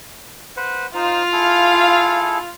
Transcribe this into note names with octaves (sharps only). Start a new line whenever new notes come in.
B4 C5 F#5
D#4 F4 C5 F5
E4 G#4 A4